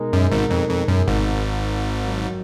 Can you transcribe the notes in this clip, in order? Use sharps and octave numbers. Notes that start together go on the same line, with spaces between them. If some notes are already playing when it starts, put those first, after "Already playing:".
Already playing: B2 G#3 D#4 A#4
F#2
G#1 G#2
F2
F2
F#2
G#1 G#2
F2 D#3 F#3